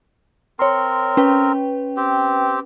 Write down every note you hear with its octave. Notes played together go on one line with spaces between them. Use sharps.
C4 A#4 C#5 C6
C#4 B4 G5
C4 G4